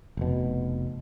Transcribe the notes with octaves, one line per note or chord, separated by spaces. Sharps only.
F1 B2